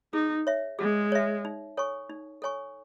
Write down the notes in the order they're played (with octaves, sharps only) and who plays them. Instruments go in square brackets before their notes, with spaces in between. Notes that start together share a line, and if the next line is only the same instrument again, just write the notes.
[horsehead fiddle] D#4 [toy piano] G#4
[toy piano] C#5 E5
[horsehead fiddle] G#3 [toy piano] G#4
[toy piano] C#5 E5
D#4
A4 C#5 G#5 C#6
D#4
A4 C#5 G#5 C#6